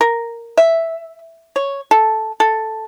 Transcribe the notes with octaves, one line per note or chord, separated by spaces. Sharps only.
A#4
E5
C#5
A4
A4